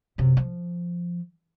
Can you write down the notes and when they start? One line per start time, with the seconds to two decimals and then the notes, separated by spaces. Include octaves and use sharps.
0.18 F#2 C3
0.37 F3